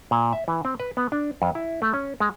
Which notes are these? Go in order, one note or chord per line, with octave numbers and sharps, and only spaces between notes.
A#2
E5
E3
C4
B4
B3
D4
F2
E4
A3
C#4
G#3